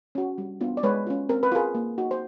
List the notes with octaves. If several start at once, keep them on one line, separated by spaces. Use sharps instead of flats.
C#4 F#4
G3
B3 D4 F4
D5
G#3 B4 C#5
C#4 F4
C4 A#4
B4
F4 G#4 A#4
A#3
D#4 F#4
C5